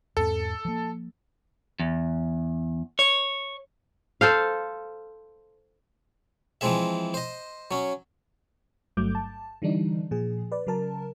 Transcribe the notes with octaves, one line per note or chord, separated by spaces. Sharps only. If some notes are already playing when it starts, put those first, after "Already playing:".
E2 G#2 C4 A4
F3 A#3
E2
C#5
A4 C5 F5
E3 F3 G#3 C4 G#4 E5
C5 D#5
F#3 C#4
G1 G2 F#3 A3 D6 G6
A5
D3 E3 G3 D4 D#4
A#2 F3 G#4
B4 D5
C#3 F#3 A#4 A5